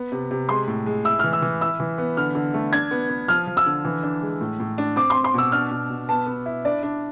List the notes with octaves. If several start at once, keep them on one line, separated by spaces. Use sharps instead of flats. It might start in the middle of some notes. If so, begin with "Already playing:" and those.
Already playing: B3
C3
C3
G#3 C6
A2
G#3
E4 E6
F6
E3
E6
E3
E4 E6
E3
B3
D3 F6
D3
A3
D4 G#6
B3
B3
F3 F6
F3
E6
D3
E3
D4
G#3
A2
A2
D4
C4 D6
C6
C4
C6
B2 E6
D4 F6
B2
B2
B3 A5
B3
E4
D4 D5
D4